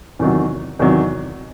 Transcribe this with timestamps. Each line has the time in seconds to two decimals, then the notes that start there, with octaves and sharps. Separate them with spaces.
0.19 E2 C3 D#3 F#3
0.79 E2 C3 D#3 F#3